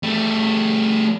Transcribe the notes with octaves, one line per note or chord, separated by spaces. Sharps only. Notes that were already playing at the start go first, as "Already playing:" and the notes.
G3 A3